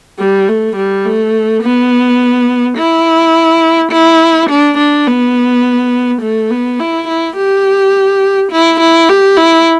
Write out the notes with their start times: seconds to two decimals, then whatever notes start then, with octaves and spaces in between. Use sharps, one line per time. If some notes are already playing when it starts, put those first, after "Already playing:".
0.19 G3
0.48 A3
0.76 G3
1.05 A3
1.63 B3
2.77 E4
3.92 E4
4.50 D4
4.78 D4
5.07 B3
6.22 A3
6.50 B3
6.79 E4
7.08 E4
7.36 G4
8.51 E4
8.80 E4
9.09 G4
9.37 E4